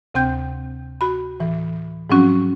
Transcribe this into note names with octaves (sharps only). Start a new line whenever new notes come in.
D2 C3 C4 G5 G6
F#4 B5
A2 E3
G#2 F3 F#3 C4 C#4 F#4